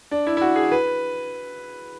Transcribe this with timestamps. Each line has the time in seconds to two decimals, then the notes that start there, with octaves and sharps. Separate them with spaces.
0.11 D4
0.27 E4
0.37 E4
0.41 F#4
0.56 G#4
0.72 B4